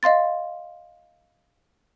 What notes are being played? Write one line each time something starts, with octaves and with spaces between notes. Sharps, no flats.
D#5 F5 C6 A6